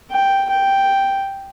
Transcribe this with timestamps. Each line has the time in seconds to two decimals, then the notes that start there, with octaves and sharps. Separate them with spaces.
0.11 G5
0.49 G5